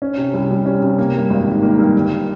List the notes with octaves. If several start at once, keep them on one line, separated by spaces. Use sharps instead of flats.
C#4
C3
C2
G3
C#4
C3
A#3
G2
G#1
D#3
A#3
G2
G1